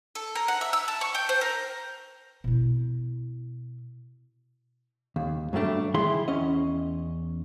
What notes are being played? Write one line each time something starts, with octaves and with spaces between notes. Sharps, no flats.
A4
A#4
F#5
E5
E6
A5
C#6
G5
C5
A#4
B2 E4
D#2
G2 F#3 G3 A3 D4
D#3 E3 E4 G#4 C6
E2 C#4 D#5